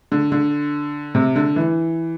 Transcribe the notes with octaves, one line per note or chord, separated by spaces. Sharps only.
D3
D3
C3
D3
E3